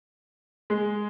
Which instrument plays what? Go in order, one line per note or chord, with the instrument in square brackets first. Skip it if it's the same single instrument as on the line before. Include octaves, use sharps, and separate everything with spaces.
[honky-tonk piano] G#3